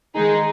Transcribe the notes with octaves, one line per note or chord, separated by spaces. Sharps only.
D#3 G#3 D#4 G#4